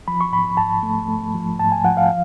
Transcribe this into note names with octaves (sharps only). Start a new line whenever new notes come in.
F3 B5
C#6
G#2 B5
G#2 A5
A3
A3
F3
G#2 A5
G#5
F3 F#5
F5